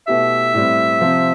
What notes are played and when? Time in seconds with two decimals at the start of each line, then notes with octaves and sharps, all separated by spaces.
0.07 B2 A3 E4 G4 E5
0.54 A2 G3 C4
1.01 C3 F3 C4